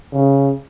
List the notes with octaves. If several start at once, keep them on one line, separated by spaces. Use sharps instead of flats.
C#3